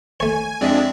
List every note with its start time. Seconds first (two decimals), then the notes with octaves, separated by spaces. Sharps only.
0.20 A3 C#5 G#5
0.61 F2 G#3 C4 D4 D5 E5